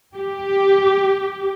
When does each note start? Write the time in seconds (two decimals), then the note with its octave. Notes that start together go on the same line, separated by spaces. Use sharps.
0.16 G4